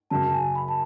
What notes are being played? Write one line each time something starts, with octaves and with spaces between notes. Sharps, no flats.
F#2 C#3 F#3 A5
A5
G#5
B5
A5